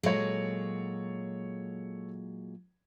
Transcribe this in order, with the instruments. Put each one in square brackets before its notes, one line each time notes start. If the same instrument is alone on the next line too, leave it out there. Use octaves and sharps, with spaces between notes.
[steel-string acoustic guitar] A#2 F#3 G#3 [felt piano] A4 C#5